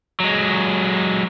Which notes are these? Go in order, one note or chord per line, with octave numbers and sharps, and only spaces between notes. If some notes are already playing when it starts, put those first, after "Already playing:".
F#3 G#3